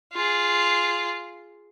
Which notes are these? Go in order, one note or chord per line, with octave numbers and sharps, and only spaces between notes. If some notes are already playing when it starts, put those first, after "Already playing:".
F4 G#4